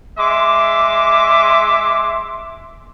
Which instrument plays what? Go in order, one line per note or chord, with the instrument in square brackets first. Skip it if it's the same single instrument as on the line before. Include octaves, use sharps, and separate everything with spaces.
[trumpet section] G#3 E5 C6 D6